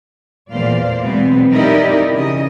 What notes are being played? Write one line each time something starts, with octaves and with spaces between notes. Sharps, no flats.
E2 A#2 C5 D5 F5
B2 F#3 G#3 B3 C4
D#4 E4 G4 A#4 D5 D#5
C#3 E3 D#5